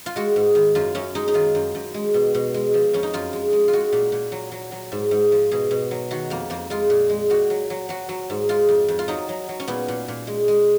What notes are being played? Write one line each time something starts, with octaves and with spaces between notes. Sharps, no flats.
F4
G#3 F#4
G#2
D#3
F#2 F4
F#2 C#4
G#3 D#4
D#4
D#3 F4
F#2
F#2
G#3
B2
B2
G#3
F3
F2 C#4
D#4
F#2 F4
G#3
G#3
F4
G#3 F#4
A#2
A#2
F#3
F#3
F#3
G#2
G#2
F3
B2 G#4
B2
F#3
D#3 F#4
F2 A#3
F2 A#3
G#3 F4
A#2
G#3
A#2 F#4
F#3
F#3
F#3 F#4
F#3
G#2
G#3 F4
F2
F2
F4
F#3 D#4
F#3
F#3
C#4
A#2 B3
A#2
A#2
G#3
G#3